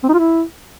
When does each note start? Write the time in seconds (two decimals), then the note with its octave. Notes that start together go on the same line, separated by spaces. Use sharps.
0.03 C4
0.09 D#4
0.14 F4
0.19 E4